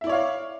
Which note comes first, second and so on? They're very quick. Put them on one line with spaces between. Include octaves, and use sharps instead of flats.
E5 E4 D5 C#5 F5